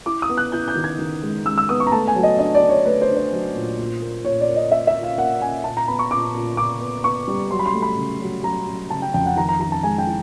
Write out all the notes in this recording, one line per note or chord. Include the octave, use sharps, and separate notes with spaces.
E4 D6
D#6
B3
F#6
E4 G6
G6
D#3
G#6
D#3
G#3
G#3 E6
E6
B3 D#6
C#6
A#5
A3 A5
G#5
F#3
D#5
D4 D#5
D5
D4
C#5
A3 B4
C5
D4
C5
F#3
A#2
A#2
A#3
A#2 C#5
D5
A#3
D#5
A#3 E5
E5
A#2
F5
A#3 F#5
A#3 G#5
A#2 A5
A#5
B3 B5
C#6
A#2 D6
A#2
A#2 D6
B3
B3 C#6
G3
F#3 C6
B5
C6
A3
B5
C#3
F#3
F#3 A#5
F#3
C#3 A5
G5
F2 G5
F#5
D#3 A#5
A#5
D#3 A#5
A5
G#3 G#5
G5
E4